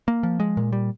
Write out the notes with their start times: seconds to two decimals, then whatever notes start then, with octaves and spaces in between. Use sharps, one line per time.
0.08 A#3
0.23 F3
0.40 G#3
0.57 A#2
0.72 G3